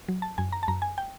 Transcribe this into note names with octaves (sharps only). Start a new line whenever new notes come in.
F#3
A5
F#2 G#5
A#5
A5
F#2 A#5
G#5
G5